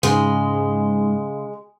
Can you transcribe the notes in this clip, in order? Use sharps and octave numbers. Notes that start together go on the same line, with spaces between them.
G#2 C#3 G#3